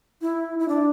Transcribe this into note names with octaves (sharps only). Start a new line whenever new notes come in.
E4
E4
D4